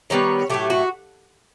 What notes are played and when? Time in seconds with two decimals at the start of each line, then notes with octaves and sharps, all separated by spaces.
0.10 D#3 G3 B3 C#5
0.50 A2 F#3 A3 G4
0.70 F#4